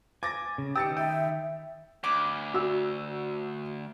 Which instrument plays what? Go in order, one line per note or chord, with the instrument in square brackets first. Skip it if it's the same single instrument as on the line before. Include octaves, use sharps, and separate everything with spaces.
[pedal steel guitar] G#5 [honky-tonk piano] D6 A6 A#6
[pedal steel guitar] C#3
[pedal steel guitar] D#3 D#4 D#6 [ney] G4 [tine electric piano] G5 [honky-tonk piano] E6 A6 C#7
[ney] E5 [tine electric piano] G5
[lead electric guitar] D2 [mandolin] B5 D6
[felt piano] F#4 E6